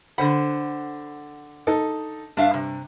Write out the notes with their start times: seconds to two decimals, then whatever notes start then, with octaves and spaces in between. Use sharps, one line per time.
0.18 D3 C5 F#5 B5
1.67 D#4 A4
2.37 G2 D4 E5 F5
2.54 C3